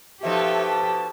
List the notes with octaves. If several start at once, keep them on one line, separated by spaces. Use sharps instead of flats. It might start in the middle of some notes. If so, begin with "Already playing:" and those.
B2 F3 D#4 G4 A4 E5
A5